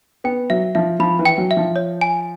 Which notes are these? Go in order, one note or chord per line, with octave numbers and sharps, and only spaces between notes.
B3 G5
F#3 E5
F3 E5
F3 B5
E3
G5
F#3
E5
F3
C#5
G#5